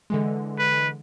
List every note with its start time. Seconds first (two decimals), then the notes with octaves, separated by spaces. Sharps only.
0.10 D3 E3 G#3
0.58 B4